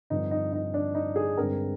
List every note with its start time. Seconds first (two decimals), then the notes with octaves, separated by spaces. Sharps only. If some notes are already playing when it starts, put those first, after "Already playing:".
0.10 G2 D3 F3 C4 D#4
0.31 D#4
0.53 D#4
0.74 D4
0.95 D#4
1.16 G#4
1.37 G2 D3 G#3 C4 A#4